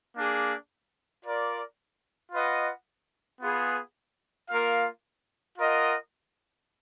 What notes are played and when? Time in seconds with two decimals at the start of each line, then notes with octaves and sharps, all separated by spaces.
0.15 A#3 D4 G#4
1.23 F4 A#4 D5
2.32 F4 B4 D#5 F#5
3.41 B3 F4 G#4 B4
4.49 A#3 F4 A#4 F5
5.57 F4 A#4 D#5 F#5